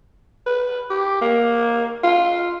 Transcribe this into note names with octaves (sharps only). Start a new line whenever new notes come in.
B4
G4
A#3
F4